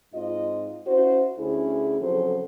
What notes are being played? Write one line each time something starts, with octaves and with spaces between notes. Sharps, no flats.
G#2 C4 F4 D#5
C#4 E4 F#4 C5
D2 C#4 E4 G#4
F2 C#3 F#3 A4 C5